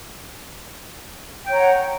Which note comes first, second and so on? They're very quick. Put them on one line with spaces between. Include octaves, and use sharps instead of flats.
G5 C#5 A#5 F#5